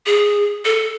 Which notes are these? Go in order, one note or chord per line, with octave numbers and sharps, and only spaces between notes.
G#4
A4